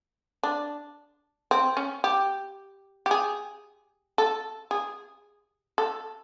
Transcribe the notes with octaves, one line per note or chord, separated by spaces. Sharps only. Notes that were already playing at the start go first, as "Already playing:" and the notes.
D4
C4
C#4
G4
G4
G#4
A4
G#4
A4